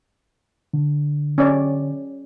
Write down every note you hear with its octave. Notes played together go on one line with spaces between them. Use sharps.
D3
C#4 D5